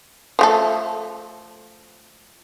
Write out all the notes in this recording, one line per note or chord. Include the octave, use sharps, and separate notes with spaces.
F3 A3 A4